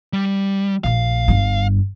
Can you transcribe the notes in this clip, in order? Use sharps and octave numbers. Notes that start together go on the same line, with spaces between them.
G3
A#1 A3 F5
G1 G2